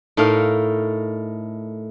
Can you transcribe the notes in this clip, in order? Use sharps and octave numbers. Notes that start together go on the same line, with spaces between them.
A2 D#4 A4 A#4 F5